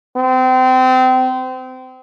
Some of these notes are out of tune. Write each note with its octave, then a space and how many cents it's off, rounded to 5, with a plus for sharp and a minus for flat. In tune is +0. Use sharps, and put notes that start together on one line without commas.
C4 -30